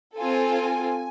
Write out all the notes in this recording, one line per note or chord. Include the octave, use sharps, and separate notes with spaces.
C4 F4 A4 G#5